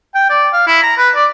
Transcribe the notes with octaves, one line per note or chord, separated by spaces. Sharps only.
G5
D5
F5
E4
A#5
B4
D5